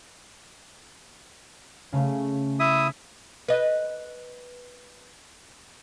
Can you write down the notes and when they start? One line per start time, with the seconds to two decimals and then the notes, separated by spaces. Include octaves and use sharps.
1.93 C#3 A3 C#4
2.60 E4 E5 D#6
3.48 B4 D#5